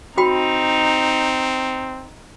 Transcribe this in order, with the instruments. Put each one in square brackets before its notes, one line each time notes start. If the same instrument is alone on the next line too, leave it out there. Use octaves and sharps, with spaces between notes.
[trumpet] C4 [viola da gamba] D#4 [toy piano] F#4 G5 B5